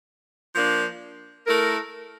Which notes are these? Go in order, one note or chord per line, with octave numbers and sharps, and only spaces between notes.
F3 A#3 D4
A3 E4 A#4